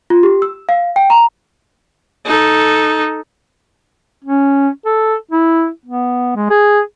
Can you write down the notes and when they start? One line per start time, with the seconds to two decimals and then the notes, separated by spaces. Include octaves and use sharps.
0.10 F4
0.23 G4
0.42 E6
0.69 F5
0.96 G5
1.10 A#5
2.25 D#4 A4
4.25 C#4
4.86 A4
5.32 E4
5.86 B3
6.36 G#3
6.50 G#4